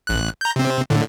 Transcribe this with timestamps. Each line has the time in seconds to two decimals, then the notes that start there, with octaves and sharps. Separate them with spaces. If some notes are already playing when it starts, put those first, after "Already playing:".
0.07 A1 F#6
0.41 A#5 G6
0.56 C3 C4
0.90 A2 D3